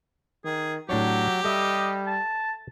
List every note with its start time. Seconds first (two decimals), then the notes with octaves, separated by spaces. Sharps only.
0.45 D#3 G#4
0.89 A2 F#3 D4 G4 C#5
1.44 G3 A4 D#5 E5
2.07 A5